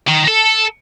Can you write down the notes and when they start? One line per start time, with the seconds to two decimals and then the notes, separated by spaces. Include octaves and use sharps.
0.08 D#3
0.28 A4